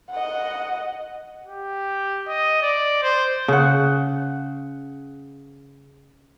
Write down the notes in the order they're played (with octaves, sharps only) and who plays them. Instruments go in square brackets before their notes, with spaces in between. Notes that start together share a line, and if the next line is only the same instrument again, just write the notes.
[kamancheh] D#5 F#5
[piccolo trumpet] G4
D#5
D5
C5
[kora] C#3 F#5